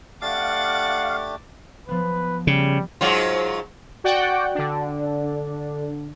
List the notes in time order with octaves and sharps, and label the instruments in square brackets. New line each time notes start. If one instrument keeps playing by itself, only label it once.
[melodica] A3 D4 G4 [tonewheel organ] F5 [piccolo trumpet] F#5 [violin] D6 A6
[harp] F3 B3 [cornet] B4
[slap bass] C#3 [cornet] G3
[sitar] G#2 F#3 F4
[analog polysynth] F#4 D5 F#5 G5
D3 D4